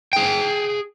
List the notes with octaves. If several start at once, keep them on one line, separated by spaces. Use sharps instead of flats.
G#4 G5